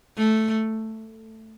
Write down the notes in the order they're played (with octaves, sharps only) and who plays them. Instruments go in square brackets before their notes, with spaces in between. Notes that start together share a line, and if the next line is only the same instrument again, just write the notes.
[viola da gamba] A3